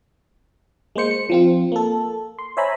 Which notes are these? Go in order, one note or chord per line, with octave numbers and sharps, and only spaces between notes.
G#3 A#3 C5 C#7
C#7
F3 C4 F4
A#3 A4
C6
C5 C#5 E5 G#5 A#5 B5